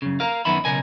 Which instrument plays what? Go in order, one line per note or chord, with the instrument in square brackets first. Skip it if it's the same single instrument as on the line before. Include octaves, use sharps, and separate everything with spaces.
[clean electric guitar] F#2 C#3
A#4 F5
F#2 D#3 B3 E5 B5
B1 C#3 A#4 G#5